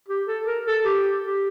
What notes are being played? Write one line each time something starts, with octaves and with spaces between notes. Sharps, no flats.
G4
A4
A#4
A4
G4
G4